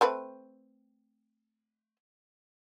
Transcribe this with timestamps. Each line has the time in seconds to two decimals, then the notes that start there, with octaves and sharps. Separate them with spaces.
0.01 A3 C4 B4